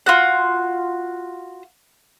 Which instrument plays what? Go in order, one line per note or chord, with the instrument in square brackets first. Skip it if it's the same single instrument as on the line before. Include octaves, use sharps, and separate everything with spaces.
[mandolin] F4 F#4 F#5